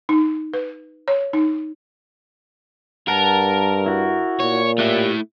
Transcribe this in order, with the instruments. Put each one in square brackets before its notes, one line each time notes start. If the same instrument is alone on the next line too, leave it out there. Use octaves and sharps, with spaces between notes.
[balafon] D#4
B4
C#5
D#4
[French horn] G2 [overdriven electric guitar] A#4 [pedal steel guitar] F#5 A5
[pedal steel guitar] E4 F#4
[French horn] A#2 [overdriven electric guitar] C#5
[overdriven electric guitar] A3 E4 [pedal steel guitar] G4 F#6